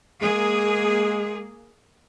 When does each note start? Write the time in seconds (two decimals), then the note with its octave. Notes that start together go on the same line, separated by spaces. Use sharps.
0.22 G#3 A#3 G#4